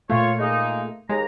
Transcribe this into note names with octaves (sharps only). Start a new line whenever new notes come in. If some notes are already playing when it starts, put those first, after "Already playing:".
A#2 A3 F4 C#5
G#3 A#3 D#4
D#2 G#3 A#5